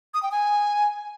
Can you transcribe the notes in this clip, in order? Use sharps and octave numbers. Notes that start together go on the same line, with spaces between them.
D#6
G5
G#5